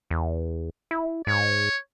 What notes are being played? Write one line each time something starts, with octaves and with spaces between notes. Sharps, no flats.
E2
E4
G#2 C#5